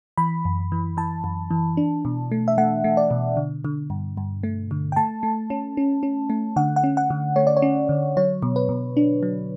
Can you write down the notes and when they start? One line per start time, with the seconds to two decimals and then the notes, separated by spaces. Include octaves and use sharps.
0.18 E3 B5
0.45 F#2
0.72 E3
0.97 E3 A5
1.24 F#2
1.51 E3
1.77 D4
2.05 B2
2.32 A3
2.48 E5
2.58 A3 F#5
2.84 A3
2.97 D5
3.11 B2
3.37 D3
3.65 D3
3.90 G2
4.17 G2
4.43 A3
4.71 D3
4.92 G5
4.96 A3 A5
5.23 A3
5.50 C#4
5.77 C#4
6.03 C#4
6.30 A3
6.56 D3 F#5
6.76 F#5
6.84 C#4
6.97 F#5
7.10 D3
7.36 A3 C#5
7.47 D5
7.57 C#5
7.62 C#4
7.89 D3
8.17 F#3 C#5
8.42 B2
8.56 B4
8.69 B2
8.97 D4
9.23 F#3